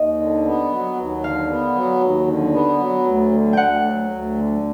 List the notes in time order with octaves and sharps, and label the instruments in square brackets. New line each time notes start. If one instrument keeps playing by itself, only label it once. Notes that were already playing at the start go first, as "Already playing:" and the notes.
Already playing: [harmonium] D#2 [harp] D#5
[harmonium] D3
B3
F#3
D#2
[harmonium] D3 [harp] F5
[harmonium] B3
F#3
D#2
D3
B3
F#3
D2
D3
[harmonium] D2 [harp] F#5 G5
[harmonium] F#3
D2
D3